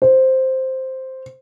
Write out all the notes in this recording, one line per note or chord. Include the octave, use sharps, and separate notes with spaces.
C5